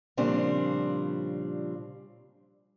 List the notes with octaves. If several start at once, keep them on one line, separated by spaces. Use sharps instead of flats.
A#2 C#3 F3 G3 C4 D4